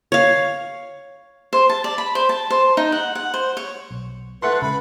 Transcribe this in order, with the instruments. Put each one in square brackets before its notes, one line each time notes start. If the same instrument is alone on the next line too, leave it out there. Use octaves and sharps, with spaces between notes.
[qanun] C#5 F5
[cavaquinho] C5
A5
D5
B5
C5
A5
C5
D#4
F#5
F#5
C5
C#5
[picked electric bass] B1
[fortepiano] A3 F#5 C6 [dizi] B4
[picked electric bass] C#3 G#3 [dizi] B5